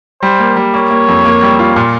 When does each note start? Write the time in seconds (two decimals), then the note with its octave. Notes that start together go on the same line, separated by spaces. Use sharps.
0.22 G3 C5
0.39 A#3
0.57 G3
0.74 A#3 C#5
0.91 A#3
1.08 F2
1.25 A#3
1.43 G3
1.59 F4
1.76 A#2